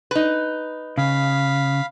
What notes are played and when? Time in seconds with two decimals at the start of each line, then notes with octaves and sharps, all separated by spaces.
0.11 D#4 B4
0.98 C#3 F5 B5